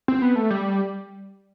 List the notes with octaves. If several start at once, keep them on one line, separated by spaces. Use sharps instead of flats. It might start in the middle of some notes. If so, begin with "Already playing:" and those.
C4
B3
A3
G3